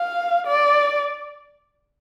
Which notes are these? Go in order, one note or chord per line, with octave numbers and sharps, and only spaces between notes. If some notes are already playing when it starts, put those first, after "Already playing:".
Already playing: F5
D5